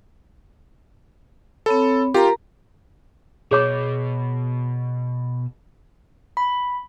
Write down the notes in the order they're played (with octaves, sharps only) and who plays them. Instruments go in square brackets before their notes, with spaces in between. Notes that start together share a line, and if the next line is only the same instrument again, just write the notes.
[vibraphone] C4 C#5 B5 [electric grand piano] A4
[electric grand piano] F4 G4 [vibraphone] A#4 A#5
[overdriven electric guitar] B2 [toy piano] G#4 C#5 D6
[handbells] B5